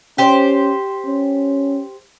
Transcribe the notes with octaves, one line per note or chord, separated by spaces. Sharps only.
C#4 G4 C5
C#4